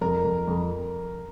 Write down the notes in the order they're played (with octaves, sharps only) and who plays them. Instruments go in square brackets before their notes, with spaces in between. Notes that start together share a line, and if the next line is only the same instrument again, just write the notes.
[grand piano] F2 [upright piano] A#4
[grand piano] F2
F2